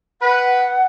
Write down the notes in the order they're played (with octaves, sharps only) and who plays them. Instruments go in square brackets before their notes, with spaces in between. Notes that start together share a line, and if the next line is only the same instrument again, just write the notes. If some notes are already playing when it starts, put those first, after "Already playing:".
[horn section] B4 [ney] F#5